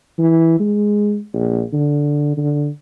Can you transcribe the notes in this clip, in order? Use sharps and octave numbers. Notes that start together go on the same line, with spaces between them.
E3
G#3
A#1
D3
D3